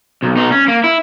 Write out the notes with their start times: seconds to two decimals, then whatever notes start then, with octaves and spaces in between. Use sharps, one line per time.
0.23 B1
0.37 B1 D#4
0.52 C#4
0.68 A#3
0.84 E4